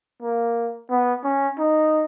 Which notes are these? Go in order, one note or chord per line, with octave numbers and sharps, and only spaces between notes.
A#3
B3
C#4
D#4